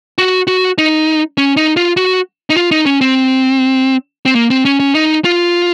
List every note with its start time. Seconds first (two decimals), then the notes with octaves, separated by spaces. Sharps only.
0.18 F#4
0.47 F#4
0.78 D#4
1.37 C#4
1.57 D#4
1.77 F4
1.97 F#4
2.50 D#4
2.57 F4
2.71 D#4
2.86 C#4
3.01 C4
4.25 C4
4.35 A#3
4.50 C4
4.65 C#4
4.80 C#4
4.95 D#4
5.24 F4